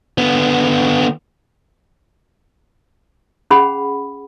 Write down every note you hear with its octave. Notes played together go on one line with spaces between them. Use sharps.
D3 B3
C#4 G#4 F#5 B5